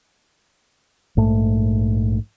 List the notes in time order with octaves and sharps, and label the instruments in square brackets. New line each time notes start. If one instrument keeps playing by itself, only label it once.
[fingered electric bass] A#1 G#2 A3